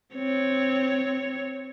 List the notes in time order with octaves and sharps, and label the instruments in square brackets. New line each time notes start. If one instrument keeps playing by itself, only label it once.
[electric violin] C4 C#5